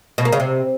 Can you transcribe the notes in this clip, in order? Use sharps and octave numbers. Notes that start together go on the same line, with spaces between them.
B2
A#3
C#3
C3